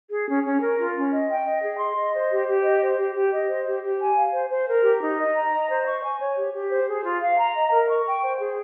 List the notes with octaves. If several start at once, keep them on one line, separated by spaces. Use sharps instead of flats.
G#4
C#4
C#4
A#4
F4
C#4
D#5
G5
D#5
G#4
C6
D#5
C5
G4
G4
D#5
C5
G4
G4
D#5
C5
G4
G4
G#5
F5
C5
C5
A#4
G4
D#4
D#5
A#5
D#5
C5
C#6
G#5
C#5
G4
G4
C5
G#4
F4
F5
A#5
D#5
A#4
C#6
G5
C5
G#4